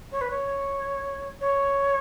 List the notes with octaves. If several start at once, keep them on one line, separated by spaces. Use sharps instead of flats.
C#5
B4
C#5
C#5